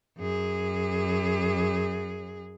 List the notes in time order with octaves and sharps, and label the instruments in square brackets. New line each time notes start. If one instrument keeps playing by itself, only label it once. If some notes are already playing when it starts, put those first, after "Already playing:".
[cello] F#2 G#4